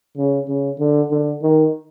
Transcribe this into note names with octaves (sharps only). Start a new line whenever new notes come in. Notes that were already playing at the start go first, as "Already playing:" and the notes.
C#3
C#3
D3
D3
D#3